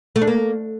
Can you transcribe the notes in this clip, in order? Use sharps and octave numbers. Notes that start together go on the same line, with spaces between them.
A3
D4
A#3